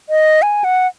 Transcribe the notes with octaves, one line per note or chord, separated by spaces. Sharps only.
D#5
G#5
F#5